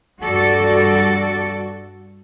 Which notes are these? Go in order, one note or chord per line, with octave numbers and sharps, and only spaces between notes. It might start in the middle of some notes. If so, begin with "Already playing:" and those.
G2 F#4 A4 D5